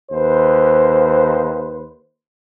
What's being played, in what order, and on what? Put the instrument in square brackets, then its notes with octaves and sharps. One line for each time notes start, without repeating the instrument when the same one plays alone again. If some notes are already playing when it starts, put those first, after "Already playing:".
[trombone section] D#2 B4 C5